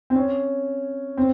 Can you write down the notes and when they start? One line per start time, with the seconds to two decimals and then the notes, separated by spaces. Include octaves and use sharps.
0.10 C4
0.15 C#4
1.17 C4